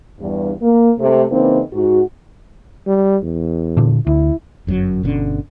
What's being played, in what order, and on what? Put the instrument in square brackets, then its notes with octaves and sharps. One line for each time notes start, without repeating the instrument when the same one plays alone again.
[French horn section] E2 G2
A#3
C3 A3
C#3 E3 A#3 C4 D#4
G#2 F#4
[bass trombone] G3
E2
[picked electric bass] A#2 D3
[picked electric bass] D2 [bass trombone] E4
[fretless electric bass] G1 F#2 B2 F#3
G1 B2 D3 C#4